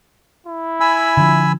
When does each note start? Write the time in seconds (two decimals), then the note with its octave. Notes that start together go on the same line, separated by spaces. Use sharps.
0.47 E4
0.80 G#5 B5 E6
1.17 D3 F3